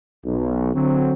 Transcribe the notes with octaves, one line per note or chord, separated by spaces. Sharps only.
B1
D3 F#3 C4